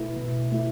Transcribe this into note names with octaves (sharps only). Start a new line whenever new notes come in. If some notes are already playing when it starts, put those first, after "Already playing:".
Already playing: B2 A3 E4 B4 E5
B2
A3 E4